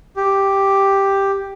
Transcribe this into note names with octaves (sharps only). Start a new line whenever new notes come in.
G4